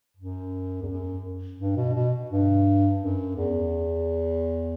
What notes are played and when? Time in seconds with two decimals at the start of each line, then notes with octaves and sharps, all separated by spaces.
0.17 F#2
0.82 E2
0.88 F#2
1.60 G2
1.76 B2
1.95 B2
2.30 G2
3.01 F#2
3.37 E2